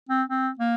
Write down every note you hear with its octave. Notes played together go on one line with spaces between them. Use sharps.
C4
C4
A#3